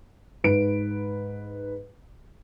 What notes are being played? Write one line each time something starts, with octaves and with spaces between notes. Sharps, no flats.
G#2 B4 D7